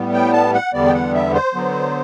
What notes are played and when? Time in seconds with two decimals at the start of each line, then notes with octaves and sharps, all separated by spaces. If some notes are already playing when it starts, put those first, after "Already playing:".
Already playing: A2 G3 B3
0.13 G5
0.33 A5
0.54 F#5
0.73 E2 D3 G3 B3 D5
0.88 G5
0.94 F#5
1.14 E5
1.34 C5
1.54 D3 F#3 B3